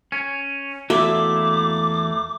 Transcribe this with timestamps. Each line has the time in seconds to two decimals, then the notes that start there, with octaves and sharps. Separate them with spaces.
0.12 C#4
0.90 E2 A3 A#3 E4 F#4 E5 D6